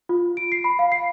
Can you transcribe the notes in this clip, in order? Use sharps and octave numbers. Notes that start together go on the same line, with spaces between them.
F4
D7
C7
B5
F5
C7